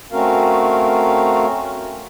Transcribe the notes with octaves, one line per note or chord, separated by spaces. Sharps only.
A3 C4 C#4 F#4 A#4 F5